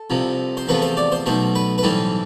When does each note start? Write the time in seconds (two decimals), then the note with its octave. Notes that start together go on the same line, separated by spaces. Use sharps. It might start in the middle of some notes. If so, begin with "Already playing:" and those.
Already playing: A4
0.10 C2 C3 F3
0.57 C5
0.68 E2 C3 F3 A3 B4
0.82 C5
0.97 D5
1.12 C5
1.26 B1 B2 A3 C5
1.55 B4
1.78 B4
1.83 B1 A2 E3 G3 C4 A4